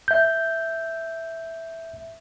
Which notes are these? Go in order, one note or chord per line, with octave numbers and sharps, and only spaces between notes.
E5 G6